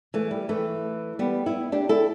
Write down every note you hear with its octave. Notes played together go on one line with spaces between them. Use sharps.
E3 A3
G3
E3 A3
G3 B3
B3 E4
D4 G4
E4 A4